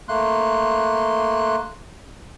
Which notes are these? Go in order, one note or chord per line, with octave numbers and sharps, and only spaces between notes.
A3 A#3 C6 F#6